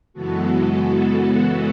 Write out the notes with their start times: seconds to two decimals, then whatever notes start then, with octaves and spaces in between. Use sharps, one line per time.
0.13 F#2 C#3 E3 G#3 B3 F#4 A4
0.72 F#4 A4